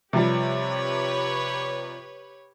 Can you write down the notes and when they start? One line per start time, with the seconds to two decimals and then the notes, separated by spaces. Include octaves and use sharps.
0.13 C3 F3 G3 G4 B4 C#5